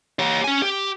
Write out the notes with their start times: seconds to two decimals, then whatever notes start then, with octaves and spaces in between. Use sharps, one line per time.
0.19 G4 C#5
0.44 C#4 G#5
0.62 G4